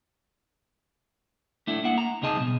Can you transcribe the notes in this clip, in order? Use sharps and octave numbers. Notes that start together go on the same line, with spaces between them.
A3 D4 E4
A#3 E4 F#5
A#5
C#2 C3 D#4 G#4 D#5 A5
B2 F3